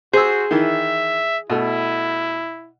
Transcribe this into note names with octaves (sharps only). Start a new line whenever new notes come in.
F#4 G#4 C5 E6
D#3 E3 E5
B2 A3 E4